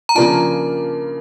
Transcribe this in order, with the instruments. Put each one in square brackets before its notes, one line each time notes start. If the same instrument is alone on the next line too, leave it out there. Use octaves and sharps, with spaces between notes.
[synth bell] A#5
[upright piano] C#3 F3 A#3 D4 F4 [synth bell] A5